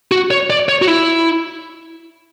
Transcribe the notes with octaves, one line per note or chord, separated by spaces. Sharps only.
F#4
C#5
D5
C#5
F#4
E4